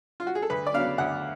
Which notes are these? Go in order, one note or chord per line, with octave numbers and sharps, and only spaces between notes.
F4
F#4
G#4
A4
D2 B4
D5
C#3 F#3 B3 D4 F5
D2 F#5